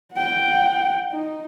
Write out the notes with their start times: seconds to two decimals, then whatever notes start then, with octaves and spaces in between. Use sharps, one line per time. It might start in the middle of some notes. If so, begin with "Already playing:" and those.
0.14 F#5 G5
1.12 D#4